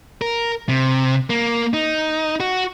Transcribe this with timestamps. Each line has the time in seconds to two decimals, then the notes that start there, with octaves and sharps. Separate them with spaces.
0.21 A#4
0.69 C3
1.30 A#3
1.74 D#4
2.40 F#4